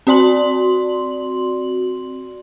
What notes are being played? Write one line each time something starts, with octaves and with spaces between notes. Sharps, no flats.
C4 F#4 D5 C6 F#7